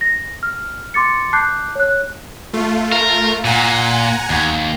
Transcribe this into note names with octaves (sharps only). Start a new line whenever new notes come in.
A#6
F6
C6 D6 A6 C#7
A5 D6 F#6 G6 C7
C#5 F#6
A3 F4
A#4
A#2 F#5 G#5 A#5
D#2